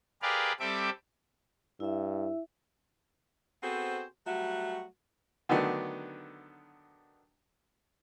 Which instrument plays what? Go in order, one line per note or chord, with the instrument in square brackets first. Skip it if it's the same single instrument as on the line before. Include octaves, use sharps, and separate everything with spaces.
[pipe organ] G4 G#4 A#4 B4 D5 F5
G3 C4 G4 A4 E5 D6
[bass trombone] G2 [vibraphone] E4 E5
[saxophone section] B3 C4 F#4 G#4 A4 C5
F#3 G3 A3 F#4
[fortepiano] D3 D#3 F#3 A3 B3 D4